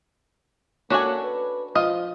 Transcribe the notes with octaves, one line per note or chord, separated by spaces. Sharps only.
A#3 C#4 D4 F#4 A4 G#5
B4
F3 F4 D#5